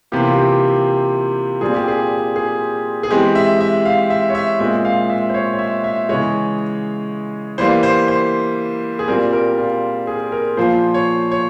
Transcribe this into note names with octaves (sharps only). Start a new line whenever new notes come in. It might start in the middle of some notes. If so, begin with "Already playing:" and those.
C3 E3 A#3 G4
F4
G4
A#2 G3 C4 G#4
G4
G#4
G#4
G#4
E3 G#3 C4 G4
E5
E5
F5
E5
C#5
E5
A#2 G#3 C4 E5
F5
E5
C5
C#5
C#5
E5
E5
C#3 E3 G#3 C#5
E3 G3 A#3 C5
C5
C5
G#4
A#2 G3 C4 A#4
A#4
F4
G#4
A#4
A#2 F3 A#3 C5
C#5
C#5